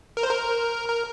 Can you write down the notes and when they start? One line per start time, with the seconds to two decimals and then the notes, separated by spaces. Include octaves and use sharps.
0.17 A#4
0.23 C5
0.31 A#4
0.89 A#4